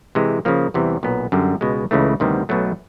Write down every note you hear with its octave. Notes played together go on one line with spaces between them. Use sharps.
C3 E3 G#3 C4
C#3 F3 A#3
E2 C3 E3 G3
B1 A#2 F#3 B3
F#2 D3 G3
C#2 B2 G#3
C#2 C#3 E3 A3
D2 C3 D#3 G3 B3
B1 B2 F#3 A3